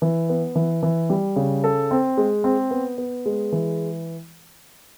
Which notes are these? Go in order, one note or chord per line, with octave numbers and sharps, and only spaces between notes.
E3
B3
E3
E3
G3
C#3
A4
C4
G#3
C4
B3
B3
G#3
E3